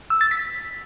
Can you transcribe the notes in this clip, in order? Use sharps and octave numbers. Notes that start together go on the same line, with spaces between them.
E6
A6
B6